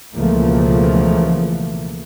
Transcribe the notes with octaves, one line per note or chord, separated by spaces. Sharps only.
C#2 B2 E3 F3 A3 A#3